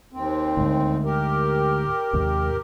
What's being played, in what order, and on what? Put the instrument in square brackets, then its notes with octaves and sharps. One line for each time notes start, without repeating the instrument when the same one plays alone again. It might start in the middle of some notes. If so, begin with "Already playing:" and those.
[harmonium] D#2 C4
[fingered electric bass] D2 G#2
[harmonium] G4 A#4
[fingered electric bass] D#2 G#2 C3